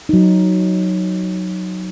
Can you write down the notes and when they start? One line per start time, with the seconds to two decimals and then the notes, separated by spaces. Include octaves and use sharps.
0.09 F#3 D#4